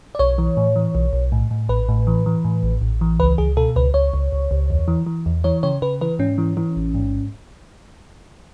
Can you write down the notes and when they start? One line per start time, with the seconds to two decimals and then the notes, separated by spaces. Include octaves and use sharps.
0.15 D5
0.19 B1 C#5
0.38 E3
0.57 A2
0.76 E3
0.95 B1
1.13 B1
1.32 A2
1.51 A2
1.69 A1 B4
1.89 A2
2.07 E3
2.26 E3
2.45 A2
2.63 A1
2.81 A1
3.01 E3
3.20 C#2 B4
3.38 C#2 G#4
3.57 B2 A4
3.76 C#2 B4
3.94 C#2 C#5
4.14 C#2
4.32 C#2
4.51 C#2
4.70 E2
4.88 E3
5.07 E3
5.26 E2
5.44 E3 C#5
5.63 C#3 C#5
5.82 C#3 B4
6.01 E3 B4
6.19 G#2 C#4
6.38 E3
6.57 E3
6.76 A1
6.95 G#2